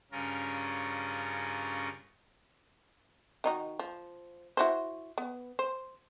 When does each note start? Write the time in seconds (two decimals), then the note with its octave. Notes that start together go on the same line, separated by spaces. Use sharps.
0.12 G2 C#3 C#4 F4 A#4
3.44 D#3 D#4 F#4
3.79 F3
4.57 E4 F#4 C5
5.18 B3
5.59 C5